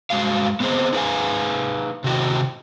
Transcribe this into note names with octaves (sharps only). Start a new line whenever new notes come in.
G2 G3 G#3 F#4 F5
B3 C4 G#4 C5 D#5
D#4 G#4 B4 F5 G#5
C3 D#3 E4 F#4 D#5 G5